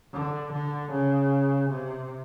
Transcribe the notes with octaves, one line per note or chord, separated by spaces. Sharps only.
D3
D3
C#3
C3